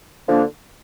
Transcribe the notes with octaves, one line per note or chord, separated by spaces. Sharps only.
D3 F3 A#3 D4